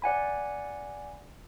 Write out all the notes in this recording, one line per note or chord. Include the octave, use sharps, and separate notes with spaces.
D5 F#5 G#5 B5